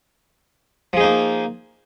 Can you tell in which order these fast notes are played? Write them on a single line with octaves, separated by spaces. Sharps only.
F3 G#4 D#4 A#3